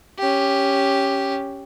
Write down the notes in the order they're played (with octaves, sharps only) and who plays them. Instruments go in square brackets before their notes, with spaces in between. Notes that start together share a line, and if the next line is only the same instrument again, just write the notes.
[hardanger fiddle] C#4 G4